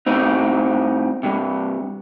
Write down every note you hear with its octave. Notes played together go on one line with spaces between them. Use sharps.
A2 C4 D#4
G2 C3